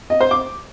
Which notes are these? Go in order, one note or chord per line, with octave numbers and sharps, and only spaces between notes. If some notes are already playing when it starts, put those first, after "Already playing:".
D#5
C5
D6